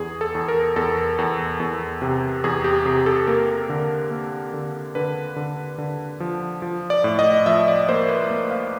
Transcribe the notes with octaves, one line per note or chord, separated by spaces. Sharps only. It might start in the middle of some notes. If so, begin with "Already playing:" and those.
Already playing: E2 G#4
A4
E2
A#4
E2 A4
E2
E2
C3
E2 G#4
G4
C3 G#4
A4
A#3 A#4
D3
A#3
D3
D3 B4
D3
D3
F3
F3
D5
A2
D#5
F3 E5
D5
A#3 C5
B4
A#3
F5